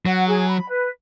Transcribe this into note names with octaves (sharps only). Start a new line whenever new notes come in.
F#3 F#5
G#4
B5
B4